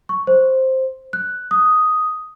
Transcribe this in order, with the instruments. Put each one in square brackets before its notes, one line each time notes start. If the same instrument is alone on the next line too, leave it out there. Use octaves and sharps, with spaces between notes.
[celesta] C#6
C5
F#6
D#6